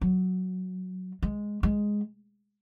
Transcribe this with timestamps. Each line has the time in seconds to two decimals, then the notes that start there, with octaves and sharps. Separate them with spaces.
0.01 F#3
1.22 G#3
1.63 G#3